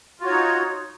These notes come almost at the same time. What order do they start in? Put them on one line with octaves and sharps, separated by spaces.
F4 F#4 C#5 D#4